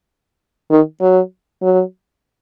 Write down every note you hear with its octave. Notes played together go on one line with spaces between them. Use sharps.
D#3
F#3
F#3